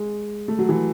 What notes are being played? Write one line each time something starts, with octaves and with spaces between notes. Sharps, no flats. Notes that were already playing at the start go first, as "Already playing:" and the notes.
Already playing: G#3
A3
F#3
E3